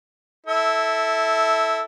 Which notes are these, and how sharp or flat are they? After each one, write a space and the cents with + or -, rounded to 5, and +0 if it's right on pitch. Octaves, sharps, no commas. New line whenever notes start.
E4 -10 A4 +0